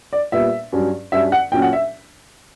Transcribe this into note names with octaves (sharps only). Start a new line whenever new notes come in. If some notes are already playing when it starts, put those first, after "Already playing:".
D5
A#2 G3 B3 E5
G2 F#3 C#4
G2 F#3 C#4 E5
F#5
A#2 F#3 C#4 G5
F#5
E5